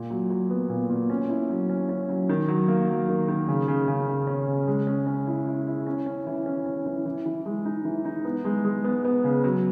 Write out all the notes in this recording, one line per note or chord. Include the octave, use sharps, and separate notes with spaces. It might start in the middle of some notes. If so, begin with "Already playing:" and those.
Already playing: A#2
F#3
F#3
B3
A#2
A#2
C#4
E4
F#3
C#4
C#4
F#3
D#3
F#3
A#3
F#3
D#3
D#3
C#3
C#3
C#3
C#3
C#4
C#3
G#3
C#4
C#4
E4
E4
E4
C#4
C#4
E3
C#4
C#4
E3
E3
E3
G#3
D#4
E3
D#4
B3
G#3
G#3
B3
B3
C#3
F#3